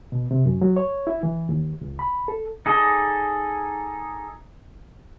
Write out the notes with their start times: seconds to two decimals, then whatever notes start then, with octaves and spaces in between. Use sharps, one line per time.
0.12 B2
0.31 C3
0.46 F#2
0.61 F#3
0.76 C#5
1.07 E4
1.23 E3
1.49 D#2
1.81 C#2
1.99 B5
2.28 A4
2.66 D#4 G#4 A4 D5 D#5